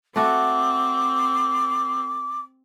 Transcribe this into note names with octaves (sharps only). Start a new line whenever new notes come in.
A3 C4 F#4 D6